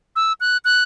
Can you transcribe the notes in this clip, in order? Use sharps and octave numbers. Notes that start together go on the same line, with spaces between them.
E6
F#6
F#6